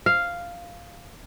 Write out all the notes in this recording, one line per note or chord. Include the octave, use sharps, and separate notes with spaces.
F5